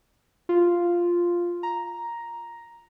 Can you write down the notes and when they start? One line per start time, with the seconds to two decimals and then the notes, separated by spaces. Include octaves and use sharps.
0.49 F4
1.63 A#5